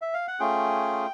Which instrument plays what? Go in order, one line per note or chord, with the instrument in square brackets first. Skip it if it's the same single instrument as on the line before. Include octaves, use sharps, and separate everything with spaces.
[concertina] E5
F5
F#5
A3 C#4 F4 G#4 G5